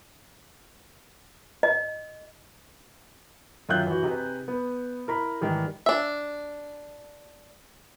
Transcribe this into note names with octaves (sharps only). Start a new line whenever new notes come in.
D#5
F#2 D#3 F4 E5 F#6 G6
E3 F#4
C3 D#4 G#4 B4
B3
E4 A#4 A#5 B5
G#2 D#3 E3 G3
D4 E5